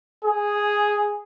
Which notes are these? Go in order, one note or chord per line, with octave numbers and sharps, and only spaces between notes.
G#4